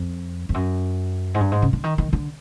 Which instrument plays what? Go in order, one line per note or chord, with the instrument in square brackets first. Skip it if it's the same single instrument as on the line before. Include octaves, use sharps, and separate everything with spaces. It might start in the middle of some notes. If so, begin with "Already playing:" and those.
Already playing: [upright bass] F2
F2
F#2
G#2
G2
G#2
C#3
D3
D#3
D#3
D3